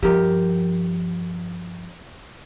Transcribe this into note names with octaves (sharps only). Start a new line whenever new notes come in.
G2 F3 G4 A#4